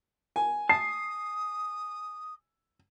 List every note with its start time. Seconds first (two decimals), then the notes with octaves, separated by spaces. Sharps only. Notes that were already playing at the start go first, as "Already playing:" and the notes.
0.36 G#5
0.69 A5 D#6 C7